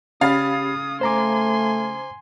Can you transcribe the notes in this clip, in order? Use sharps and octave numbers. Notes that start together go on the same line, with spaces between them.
C#3 C#4 G4 F5 B5 D#6 A6
A3 C5 G#5 A#5 C6 D6